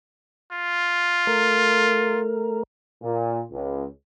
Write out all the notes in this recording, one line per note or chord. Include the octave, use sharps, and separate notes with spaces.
F4
A3 A#4
A#2
C#2